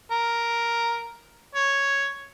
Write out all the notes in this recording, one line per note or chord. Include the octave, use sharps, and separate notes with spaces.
A#4
C#5